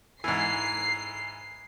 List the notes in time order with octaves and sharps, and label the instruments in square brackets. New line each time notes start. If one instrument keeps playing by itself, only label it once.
[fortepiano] G#2 E3 [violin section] C7